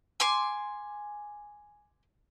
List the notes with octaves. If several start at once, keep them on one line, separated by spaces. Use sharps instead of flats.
G#5 C6 D6